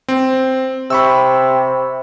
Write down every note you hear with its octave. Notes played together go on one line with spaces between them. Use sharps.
C4
C3 B5 C#6 E6